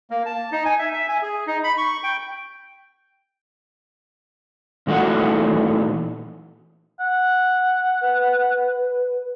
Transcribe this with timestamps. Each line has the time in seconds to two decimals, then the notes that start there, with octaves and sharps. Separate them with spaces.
0.10 A#3
0.26 A5
0.52 D#4
0.65 G#5
0.79 E5
0.93 E5
1.09 G#5
1.22 G#4
1.47 D#4
1.64 B5
1.78 C#6
2.03 G5
4.87 A#2 E3 A3 D#4 F#4 F#5
7.00 F#5
8.02 B4